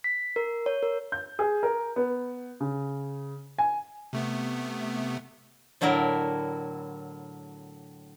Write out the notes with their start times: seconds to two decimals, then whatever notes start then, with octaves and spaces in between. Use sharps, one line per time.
0.04 B6
0.36 A#4
0.66 C#5
0.83 A#4
1.12 G6
1.39 G#4
1.63 A#4
1.96 B3
2.60 C#3
3.58 G#5
4.13 C3 A3 B3
5.81 A2 D3 F#3 E4 A#4